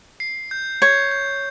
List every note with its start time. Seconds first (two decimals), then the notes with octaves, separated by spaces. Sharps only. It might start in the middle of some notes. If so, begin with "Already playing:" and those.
0.20 C7
0.51 G6
0.82 C#5 G6
1.12 G6